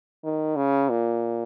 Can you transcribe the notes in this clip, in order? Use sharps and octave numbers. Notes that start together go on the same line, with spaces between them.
D#3
C#3
A#2